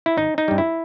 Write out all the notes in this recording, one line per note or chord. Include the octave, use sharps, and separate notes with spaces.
E4
G#1 D#4
D#4
G2 G3
E4